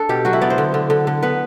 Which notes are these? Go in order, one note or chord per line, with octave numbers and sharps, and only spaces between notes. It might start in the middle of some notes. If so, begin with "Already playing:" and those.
Already playing: D4 A4
B2 G4
F#3 F#4
E4
B3 D5
C5
D3
D3
D3
D3
B3 B4